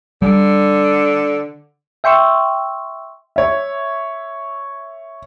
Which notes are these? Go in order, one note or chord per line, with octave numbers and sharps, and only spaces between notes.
D3 G3
E5 G5 C6 C#6 E6
C#5 E5